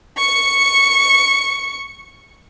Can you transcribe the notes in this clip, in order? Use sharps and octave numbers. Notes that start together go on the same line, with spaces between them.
C#6 C#7